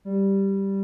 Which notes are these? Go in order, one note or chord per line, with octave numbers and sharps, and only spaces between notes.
G3